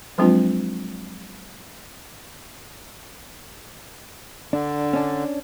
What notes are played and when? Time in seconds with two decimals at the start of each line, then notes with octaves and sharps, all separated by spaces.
0.18 F3 F#3 G#3 C4 D4 F4
4.53 D3 D4
4.93 C#4 D4